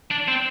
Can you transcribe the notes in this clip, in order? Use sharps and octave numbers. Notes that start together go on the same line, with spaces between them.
D4
C4